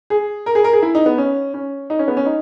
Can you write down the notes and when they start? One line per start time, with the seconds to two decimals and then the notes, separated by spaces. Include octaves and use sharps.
0.10 G#4
0.46 A#4
0.55 G#4
0.64 A#4
0.73 G#4
0.82 E4
0.95 D#4
1.06 B3
1.18 C#4
1.54 C#4
1.90 D#4
1.99 C#4
2.08 B3
2.17 C#4
2.26 D#4